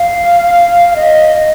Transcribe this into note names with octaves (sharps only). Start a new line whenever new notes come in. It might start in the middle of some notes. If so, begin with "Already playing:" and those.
Already playing: F5
F5
D#5
D#5